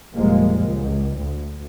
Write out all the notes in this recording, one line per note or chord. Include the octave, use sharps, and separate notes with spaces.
F1 A#2 F3 G3 G#3 A#3
C#2
D2